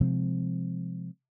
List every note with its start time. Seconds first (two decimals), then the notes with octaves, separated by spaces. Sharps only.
0.01 C3 F3 G#3 C4